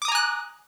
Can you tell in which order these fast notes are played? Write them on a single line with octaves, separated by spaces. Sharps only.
D6 D#6 A#5 G#5 F#6